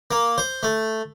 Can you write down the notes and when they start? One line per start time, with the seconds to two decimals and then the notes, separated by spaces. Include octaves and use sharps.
0.11 A#3
0.38 C5
0.63 A3